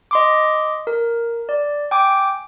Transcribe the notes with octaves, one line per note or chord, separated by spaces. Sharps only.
D#5 C6 D6
A#4
D5
G5 G#5 D6